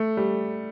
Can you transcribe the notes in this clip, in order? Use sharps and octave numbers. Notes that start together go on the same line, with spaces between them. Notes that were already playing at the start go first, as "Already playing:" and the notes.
Already playing: A3
G3